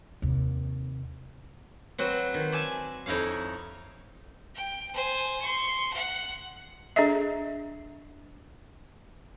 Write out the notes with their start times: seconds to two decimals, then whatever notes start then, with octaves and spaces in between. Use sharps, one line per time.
0.22 D#2 C3
1.98 F#3 C4 F#4 B4
2.34 D#3
2.52 D5 E5 G#5 A5
3.06 F2 D#4 E4 C#5 F5
4.55 G5
4.94 C5 G#5
5.42 C6 C#6
5.93 F#5
6.96 D4 G#4 A4 D#5 E5